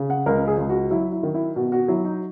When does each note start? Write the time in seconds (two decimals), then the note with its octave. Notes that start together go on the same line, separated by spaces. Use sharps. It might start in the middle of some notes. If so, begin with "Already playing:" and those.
Already playing: C#3
0.10 F#5
0.26 C#2 A#4
0.48 G#4
0.58 C#2
0.69 F#4
0.90 F#3 E4
1.12 E4
1.23 D#3
1.34 E4
1.56 B2 F#4
1.72 F#4
1.88 F#3 E4
2.05 D#4